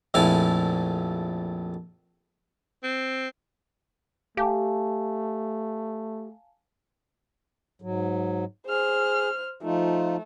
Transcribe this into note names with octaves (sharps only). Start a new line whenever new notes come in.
A#1 F2 A3 E4 F5 G#5
C4
A3 G4 F5 G#5 A5
G#2 F#3
G#4 C5 F6
F3 A3 D#4 F4